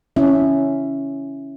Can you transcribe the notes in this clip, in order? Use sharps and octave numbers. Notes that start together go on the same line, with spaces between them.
C#4 E4 E5